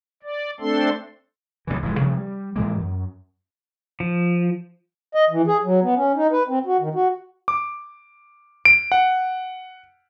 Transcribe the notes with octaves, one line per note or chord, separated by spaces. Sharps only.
D5
A3 C4 D4 A4 C6
C#2 G2 B2 E3
F1 G#2 E3 G#3
C3 F3 G3 A3
G3
A2 E3 G#3 A#3
F#2
F3
D#5
E3
G#4
F#3
B3
C#4
D#4
B4
C4
F#4
D#3
F#4
D6
D7
F#5